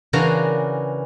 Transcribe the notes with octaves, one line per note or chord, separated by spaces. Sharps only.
C#3 E3 D4 F#4 A#4 F5